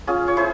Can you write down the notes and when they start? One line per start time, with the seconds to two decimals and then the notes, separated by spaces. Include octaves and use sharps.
0.07 C#4 F4 G#4
0.28 C#5
0.37 E4 G#4 C5